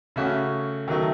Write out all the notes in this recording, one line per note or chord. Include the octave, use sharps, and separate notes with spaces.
C#3 A3 C#4 F#4
D#3 F#3 A3